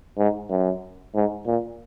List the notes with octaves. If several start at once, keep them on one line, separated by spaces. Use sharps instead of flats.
G#2
F#2
G#2
A#2